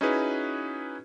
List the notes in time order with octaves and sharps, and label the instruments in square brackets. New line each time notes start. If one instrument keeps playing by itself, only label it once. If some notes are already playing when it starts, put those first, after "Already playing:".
[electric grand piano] C#4 D#4 E4 F#4 G#4 B4